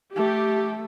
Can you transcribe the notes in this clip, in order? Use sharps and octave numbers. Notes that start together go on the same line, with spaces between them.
A3 G4